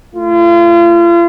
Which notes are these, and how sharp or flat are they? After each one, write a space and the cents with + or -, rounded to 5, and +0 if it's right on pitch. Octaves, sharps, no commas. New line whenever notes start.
A3 +0 F4 -40